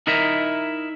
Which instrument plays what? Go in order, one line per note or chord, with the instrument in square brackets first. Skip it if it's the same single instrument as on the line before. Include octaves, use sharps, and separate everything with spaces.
[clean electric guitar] D#4 E4 A#4 D#5 E5